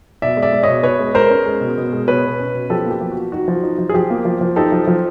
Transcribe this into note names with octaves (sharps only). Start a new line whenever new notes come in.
B2 D5 E5
G#3
D5 E5
G#3
B2 C#5 D#5
B2 B4 C#5
G#3
G#3 A#4 C5
C#4
G#3
B2
B2
G#3
B2 B4 C#5
B2
C#4
B2
F3 G4 A4
A#3 G4
F3
F#4
F3
D#4 F#4
F3
D#4
F3
G#4
F3 G4
A#3
F3
F3
D#4 G4 A4
F3
F3